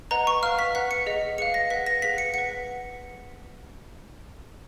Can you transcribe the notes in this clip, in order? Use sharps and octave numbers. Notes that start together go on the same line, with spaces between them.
B4 D#5 F#5 A#5
C#6
B4 F5 F6
B6
B4 F#5 B6
C#7
G#4 D#5 F#5
G#4 B4 F5 C#7
A#6
B4 F#5 B6
A#6
G#4 B4 F5 B6
C#7
B4 F#5 C#7